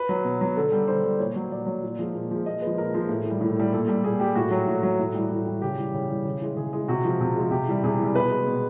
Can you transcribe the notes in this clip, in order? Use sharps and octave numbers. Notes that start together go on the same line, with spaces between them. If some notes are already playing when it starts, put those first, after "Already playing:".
Already playing: B4
F#3
B2
F#3
D3 A4
G3
D3 C5
G3
A#2 C#5
F#3
A#2 D5
F#3
A#2
F3 G#3
A#2
F3 G#3
A#2 D#5
G#3 B4
F3
A#2 A#4
F3 G#3
A2
E3 G3
A2
E3 G3
A#2 A4
G3
A#2 G#4
G3 G4
A2 F#4
F#3
A2
F#3
A2
E3 G3
A2
E3 G3
C#3 G4
E3 G3
C#3
E3 G3
C#3
E3 G#3
C#3 G#4
E3 G#3 G#4
C3 F#4
F3 G#3
C3
F3 G#3
C3 G4
E3 G3
C3 G#4
E3 G3
B2 B4
G#3
B2